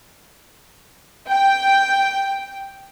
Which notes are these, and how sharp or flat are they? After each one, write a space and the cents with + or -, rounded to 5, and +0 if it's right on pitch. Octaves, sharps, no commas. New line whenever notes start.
G5 +0